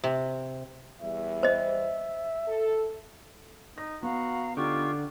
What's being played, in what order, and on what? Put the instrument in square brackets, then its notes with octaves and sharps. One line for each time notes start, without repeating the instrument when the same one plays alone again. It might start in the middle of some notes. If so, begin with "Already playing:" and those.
[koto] C3
[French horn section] E2 G3 [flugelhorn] E5
[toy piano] C5 D#5
[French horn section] A4
[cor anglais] D#4 [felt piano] A#6
[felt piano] B3 [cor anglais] F#4 [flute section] F5 A#5
[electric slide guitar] D3 [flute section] D#4 F4 C#6 [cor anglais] G4